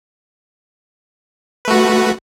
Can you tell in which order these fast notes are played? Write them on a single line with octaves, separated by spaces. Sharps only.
B4 A3 F#4